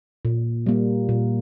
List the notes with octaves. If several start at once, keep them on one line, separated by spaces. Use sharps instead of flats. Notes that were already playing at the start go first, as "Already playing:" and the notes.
A#2
G3 A#3
A#2